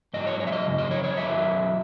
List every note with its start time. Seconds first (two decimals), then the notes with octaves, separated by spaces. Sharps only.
0.14 G#2 F#3 D#5
0.27 C#5
0.40 C#5
0.47 E5
0.52 D#5
0.65 F#2 C#3
0.78 D#5
0.91 C#5
1.04 C#5
1.16 F#2 D#3 F#3 E5